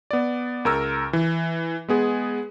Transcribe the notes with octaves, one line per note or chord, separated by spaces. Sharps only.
B3 D5
C#2 A#4 E6
E3
G#3 B3 G#4